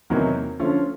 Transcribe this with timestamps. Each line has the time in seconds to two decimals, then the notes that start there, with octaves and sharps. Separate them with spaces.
0.10 E2 C3 D#3 F#3 A#3
0.59 D3 F3 A3 C#4 F4